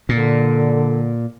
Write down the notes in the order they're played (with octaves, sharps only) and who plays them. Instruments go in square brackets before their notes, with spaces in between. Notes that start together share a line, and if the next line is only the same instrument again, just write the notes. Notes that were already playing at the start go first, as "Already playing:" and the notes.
[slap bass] A#2 [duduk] D3